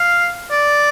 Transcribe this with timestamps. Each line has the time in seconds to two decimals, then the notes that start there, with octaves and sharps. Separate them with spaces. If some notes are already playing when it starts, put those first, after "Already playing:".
Already playing: F5
0.51 D5